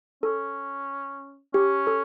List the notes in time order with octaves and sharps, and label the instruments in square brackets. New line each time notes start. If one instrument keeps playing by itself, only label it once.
[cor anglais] C#4 [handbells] A4
[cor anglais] C#4 [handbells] G4
[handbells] A4